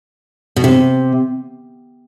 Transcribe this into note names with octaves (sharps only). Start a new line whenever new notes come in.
B2
C3